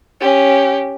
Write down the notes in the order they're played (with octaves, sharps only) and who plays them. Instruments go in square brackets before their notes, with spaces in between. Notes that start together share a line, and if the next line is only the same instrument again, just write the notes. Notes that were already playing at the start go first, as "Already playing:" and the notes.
[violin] C#4 G4